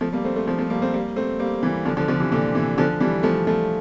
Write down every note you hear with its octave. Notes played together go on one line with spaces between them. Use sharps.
F3 A3
G3 A#3
A3 C4
A3 C4
F3 A3
F3 A3
G3 A#3
A3 C4
G3 A#3
A3 C4
G3 A#3
E3 G3
D3 F3
D3 F3
D3 F3
C3 E3
A#2 D3
C3 E3
D3 F3
E3 G3
F3 A3
F3 A3